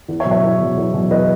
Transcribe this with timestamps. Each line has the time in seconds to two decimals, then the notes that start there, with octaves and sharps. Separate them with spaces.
0.08 E2
0.20 C#5 E5
0.25 B2 F#3
0.31 C#5 E5
0.43 E2
0.60 B2 F#3
0.77 E2
0.94 B2 F#3
1.10 E2 B4 D#5